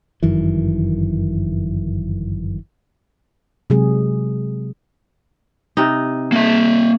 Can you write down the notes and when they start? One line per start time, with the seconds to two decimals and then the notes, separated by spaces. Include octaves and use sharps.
0.23 G1 F#2 D#3 E3
3.70 C3 F#3 G#3 G#4
5.77 C3 D#4
6.32 A#3 E5